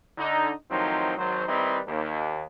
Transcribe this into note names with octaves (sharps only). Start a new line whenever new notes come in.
D3 D#4
A2 D#3 F3 F#3 C4 D#4
G#1 F#3 C5
D#3 G3 C4 D#4 E4 B4
D#2